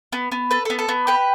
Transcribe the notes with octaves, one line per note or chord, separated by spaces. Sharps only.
B3
B3
A4 B4
A4
B3
A4
B3
G4 B4